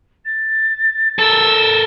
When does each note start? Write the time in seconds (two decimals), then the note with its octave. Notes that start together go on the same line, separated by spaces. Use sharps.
0.25 A6
1.19 A4 A#4 E6